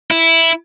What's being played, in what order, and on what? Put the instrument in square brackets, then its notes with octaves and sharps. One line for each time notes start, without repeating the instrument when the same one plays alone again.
[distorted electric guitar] E4